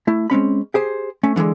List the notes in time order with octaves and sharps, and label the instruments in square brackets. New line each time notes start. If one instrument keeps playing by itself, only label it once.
[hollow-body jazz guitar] A3 E4
G#3 C4 C#4 B5
G4 G#4 C5
A3 C#4
D3 E3 F#3 G#3